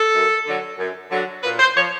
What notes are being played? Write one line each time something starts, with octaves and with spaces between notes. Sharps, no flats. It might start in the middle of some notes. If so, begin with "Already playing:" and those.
Already playing: A4
F#2
D3 F#3
F#2
D3 F#3
A#2 B4
C5
F3 C#5